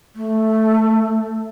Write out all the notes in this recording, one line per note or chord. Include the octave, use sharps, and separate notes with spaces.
A3